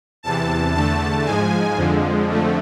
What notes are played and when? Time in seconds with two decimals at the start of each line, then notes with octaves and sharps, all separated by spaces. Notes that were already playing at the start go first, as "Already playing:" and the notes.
0.23 E2 C3 E3 A5
0.74 E2 D3 A3 A5
1.25 G#2 F3 G#3 G#5
1.77 F2 D3 F3 G#3
2.28 F2 D3 F3 A3